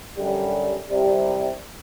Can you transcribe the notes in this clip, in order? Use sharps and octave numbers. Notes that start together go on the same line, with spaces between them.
F#2 D3 G3
C2 C3 G3